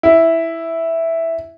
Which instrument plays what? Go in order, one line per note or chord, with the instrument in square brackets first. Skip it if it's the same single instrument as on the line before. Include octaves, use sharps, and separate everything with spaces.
[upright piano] E4